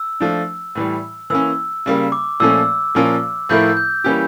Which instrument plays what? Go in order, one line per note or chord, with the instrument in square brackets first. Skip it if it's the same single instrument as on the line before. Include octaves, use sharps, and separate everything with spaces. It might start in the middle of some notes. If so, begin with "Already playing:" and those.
Already playing: [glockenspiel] E6
[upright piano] F3 A3 D4
A2 E3 G3
[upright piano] E3 A#3 C#4 [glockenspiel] E6
[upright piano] C#3 G3 A#3
[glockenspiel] D6
[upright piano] A#2 F3 A3 C#4 [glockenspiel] E6
[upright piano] A#2 F3 C#4 F4 A#4
[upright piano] A2 F3 A3 E4 A#4 [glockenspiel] G6
[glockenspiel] G6
[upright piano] E3 G3 A#3 C#4 G4